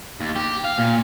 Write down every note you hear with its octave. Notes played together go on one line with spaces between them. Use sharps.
D#2
G4
F5
A#2